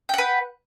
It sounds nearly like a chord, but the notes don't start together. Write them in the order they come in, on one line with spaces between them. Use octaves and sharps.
G5 F#5 B4